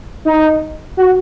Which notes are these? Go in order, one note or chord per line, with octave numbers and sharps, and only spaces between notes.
D#4
F#4